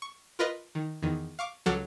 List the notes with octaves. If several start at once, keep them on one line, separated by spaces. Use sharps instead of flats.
C#6
F4 A#4 B4 D#5
D#3
E2 D#3
F5 C#6 D6
C#2 F#3 A4 F#5 D6 F6